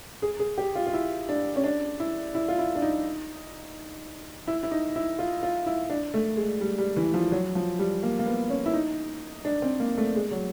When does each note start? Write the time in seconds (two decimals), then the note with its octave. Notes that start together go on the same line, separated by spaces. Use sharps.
0.22 G#4
0.39 G#4
0.58 G4
0.75 F4
0.87 F4
0.94 E4
1.29 D4
1.56 C#4
1.64 D4
2.00 E4
2.35 E4
2.48 F4
2.59 E4
2.75 D4
2.82 D#4
4.48 E4
4.63 E4
4.71 D#4
4.96 E4
5.19 F4
5.43 F4
5.66 E4
5.90 D4
6.14 A3
6.37 G#3
6.61 G3
6.78 G3
6.97 E3
7.14 F3
7.32 F#3
7.55 F3
7.79 G3
8.03 A#3
8.19 A#3
8.26 B3
8.50 C#4
8.66 E4
8.74 D#4
9.45 D4
9.62 C4
9.80 A#3
9.98 A3
10.16 G#3
10.31 F#3